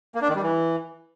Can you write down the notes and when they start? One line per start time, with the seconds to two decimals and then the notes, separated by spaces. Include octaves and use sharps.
0.15 A#3
0.22 D4
0.29 D#3
0.36 G3
0.43 E3